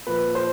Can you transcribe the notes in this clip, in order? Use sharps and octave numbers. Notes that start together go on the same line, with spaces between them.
A#2 F3 B4
C5